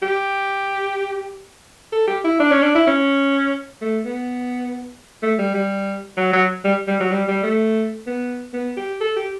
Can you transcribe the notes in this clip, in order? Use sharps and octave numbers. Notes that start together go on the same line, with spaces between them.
G4
A4
G4
E4
D4
C#4
D4
E4
C#4
A3
B3
A3
G3
G3
F#3
F#3
G3
G3
F#3
G3
G3
A3
B3
B3
G4
A4
G4